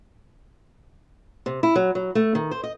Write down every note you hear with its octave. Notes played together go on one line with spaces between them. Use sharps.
C3
E4
F#3
F#3
A3
D#3
C5
D#5